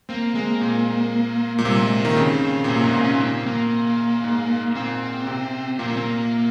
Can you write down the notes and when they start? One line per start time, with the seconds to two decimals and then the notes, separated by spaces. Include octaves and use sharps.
0.09 A#3 C4
0.35 G#3 A#3
0.61 A#2
1.58 A#2 G#3
1.65 C3 G3
1.81 G#3
1.99 A#3
2.05 D#3
2.16 C#3 C4
2.43 C4
2.64 A#2
2.68 C3 A#3
2.84 G#2 A#3
2.94 A#2
3.03 C#4
3.20 C4
3.46 A#3
4.24 G#2
4.75 A#2 C4
5.27 C3
5.79 A#2 A#3
5.87 C4
5.96 A#3